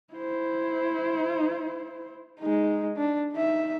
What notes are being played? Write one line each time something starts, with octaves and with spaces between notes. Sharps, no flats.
E4 C5
G#3 D#4
D4
D#4 E5